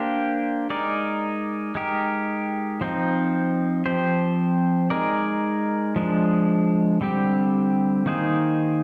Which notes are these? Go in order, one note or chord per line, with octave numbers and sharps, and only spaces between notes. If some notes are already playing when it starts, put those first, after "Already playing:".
Already playing: A#3 D4 G4 C5
G#3 D#4 A#4 D5
G#3 D#4 G4 A#4
F3 C4 D#4
F3 C4 G4 C5
G#3 D#4 A#4 D5
F3 G#3 D4
D3 G3 C4 G4
D#3 A#3 D#4 G#4 C5